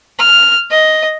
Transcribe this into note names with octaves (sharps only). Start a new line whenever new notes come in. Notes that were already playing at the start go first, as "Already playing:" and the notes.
F6
D#5